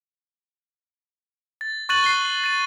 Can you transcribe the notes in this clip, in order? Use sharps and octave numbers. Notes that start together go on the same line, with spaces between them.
A6
C#6 F#6 A6 D#7 F#7
C7 G7
A6 D#7